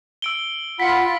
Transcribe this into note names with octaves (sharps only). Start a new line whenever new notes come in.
E6 D7 G7
F4 F#5 B5 B6 C#7